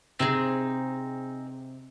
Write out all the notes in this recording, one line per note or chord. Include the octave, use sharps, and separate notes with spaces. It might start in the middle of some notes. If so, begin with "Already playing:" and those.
C3 C4 D#4 G#4